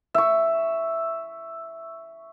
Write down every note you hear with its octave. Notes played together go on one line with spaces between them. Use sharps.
E5 C#6